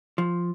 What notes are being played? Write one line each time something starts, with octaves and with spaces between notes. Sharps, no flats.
F3